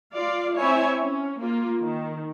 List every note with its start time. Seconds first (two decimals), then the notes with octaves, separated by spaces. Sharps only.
0.13 F4 D5 F5
0.58 C4 E4 C#5 E5 G#5
1.00 C#4
1.40 A#3 F4
1.80 D#3